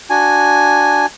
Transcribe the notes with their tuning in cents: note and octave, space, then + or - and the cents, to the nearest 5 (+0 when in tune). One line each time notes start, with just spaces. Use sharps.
D4 +0 F#4 +0 G#5 +0